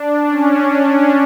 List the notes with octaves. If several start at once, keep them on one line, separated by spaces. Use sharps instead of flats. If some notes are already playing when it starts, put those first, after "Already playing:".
Already playing: D4
C#4